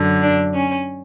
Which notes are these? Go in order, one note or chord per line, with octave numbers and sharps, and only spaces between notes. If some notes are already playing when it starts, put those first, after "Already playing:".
Already playing: F#2 D3
D4
C#4